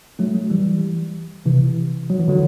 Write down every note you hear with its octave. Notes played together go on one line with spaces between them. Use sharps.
F#3 A3
F#3 A3
E3 G3
C3 E3
F#3
E3
D3 F#3